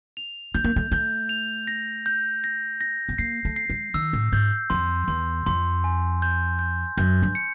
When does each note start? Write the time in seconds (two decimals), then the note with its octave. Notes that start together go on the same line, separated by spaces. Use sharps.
0.17 F7
0.55 A3 G6
0.64 A#3
0.76 A3
0.91 A3 G6
1.29 F7
1.67 A#6
2.06 G6
2.44 A#6
2.81 A#6
3.09 B3
3.18 A#3 C7
3.45 A3
3.56 C7
3.70 G#3
3.94 D#3 E6
4.13 A2
4.32 G#2 G6
4.70 F2 C6
5.08 E2 C6
5.46 F2 C6
5.84 G#5
6.22 G6
6.59 G6
6.97 F#2 G6
7.22 G2
7.35 C#7